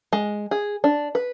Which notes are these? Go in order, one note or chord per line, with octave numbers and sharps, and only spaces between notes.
G#3
G#4
D4
B4